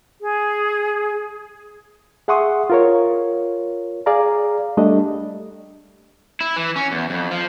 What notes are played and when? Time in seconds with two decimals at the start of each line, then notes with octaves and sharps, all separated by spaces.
0.21 G#4
2.28 G#4 E5 F#5 C6 C#6 D#6
2.70 F4 A#4 C#5
4.06 G#4 D5 F5 A#5
4.77 G3 A3 D4 D#5
6.40 E4
6.56 E3
6.76 C#4
6.92 E2
7.10 F2
7.31 F3